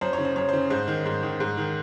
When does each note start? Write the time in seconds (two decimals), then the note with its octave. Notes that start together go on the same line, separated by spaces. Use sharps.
0.01 F#2 C5
0.13 C#5
0.18 C#3
0.25 C5
0.36 F#2 C#5
0.49 C#3 C5
0.70 G#2 C5
0.88 D#3
1.06 G#2
1.23 D#3
1.40 G#2
1.57 D#3